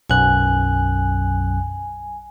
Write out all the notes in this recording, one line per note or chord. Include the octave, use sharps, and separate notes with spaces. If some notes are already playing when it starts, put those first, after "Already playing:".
B1 F#2 G#5 F#6